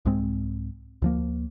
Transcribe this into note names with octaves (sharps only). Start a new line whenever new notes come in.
C2 G#2 G#3 C4
D2 F3 A#3